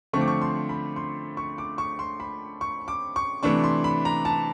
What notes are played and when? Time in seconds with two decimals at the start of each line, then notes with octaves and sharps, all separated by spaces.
0.13 D3 F3 A3 C4 C#6
0.21 D6
0.28 C#6
0.42 C6
0.69 B5
0.96 C6
1.37 C#6
1.58 D6
1.78 C#6
1.99 C6
2.20 B5
2.61 C#6
2.88 D6
3.16 C#6
3.43 C3 E3 A3 D4 C#6
3.64 C6
3.84 B5
4.05 A#5
4.25 A5